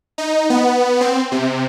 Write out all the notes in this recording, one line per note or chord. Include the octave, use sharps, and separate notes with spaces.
D#4
B3
C4
C3